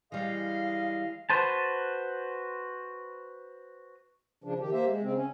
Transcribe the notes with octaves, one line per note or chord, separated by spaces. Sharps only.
E3 G3 G#3 D#5 F5
F#4 B4 C5 A5
C#3 F3 D4
D#3 G4
A#3 G4 C5 E5
G#3
C#3 C4
C#4